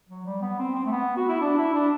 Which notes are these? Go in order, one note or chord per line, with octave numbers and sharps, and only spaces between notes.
F#3
G3
B3
C4
C4
A3
B3
F#4
E4
D4
E4
D4